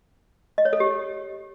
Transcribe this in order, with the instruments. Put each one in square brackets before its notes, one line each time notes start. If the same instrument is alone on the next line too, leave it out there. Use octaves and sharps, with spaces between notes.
[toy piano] D#5
C#5
A4
G4